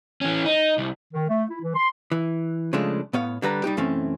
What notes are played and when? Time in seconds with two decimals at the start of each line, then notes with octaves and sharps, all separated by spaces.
0.21 E3 C#4
0.45 D#4
0.78 C2
1.13 D#3
1.28 A3
1.49 E4
1.61 E3
1.75 C6
2.12 E3
2.73 C#3 F3 G#3 A3 D4
3.13 A2 B3 C#5 F5
3.42 D3 G3 B4 A#5
3.64 G3 D#4 G4
3.77 B1 F#2 E3 A3 C4 C#4